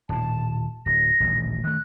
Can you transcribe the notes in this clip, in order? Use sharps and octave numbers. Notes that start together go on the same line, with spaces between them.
D#1 A2 A5
D1 A#6
D#1 A1 D2
D#3 A3 F#6